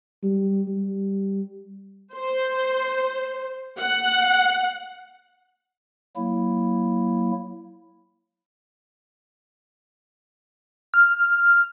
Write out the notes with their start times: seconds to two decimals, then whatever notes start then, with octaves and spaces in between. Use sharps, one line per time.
0.23 G3
0.68 G3
2.15 C5
3.79 F#5
6.16 F#3 A#3 E4
10.94 F6